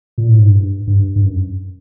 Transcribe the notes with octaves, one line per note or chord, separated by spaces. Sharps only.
A#2
A2
G#2
G2
G2
G2
F#2